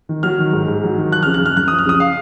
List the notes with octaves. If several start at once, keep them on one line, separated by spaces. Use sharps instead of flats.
D#3
F#3 F6
D#3
G#2
G#2
F#3
D#3
F3 F#6
C#3 F6
F#6
F#2 F6
F#2 F#6
F3 D#6
F6
C#3 D#6
F5